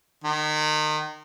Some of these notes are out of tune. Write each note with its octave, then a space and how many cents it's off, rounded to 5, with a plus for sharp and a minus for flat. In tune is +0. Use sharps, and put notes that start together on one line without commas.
D#3 -30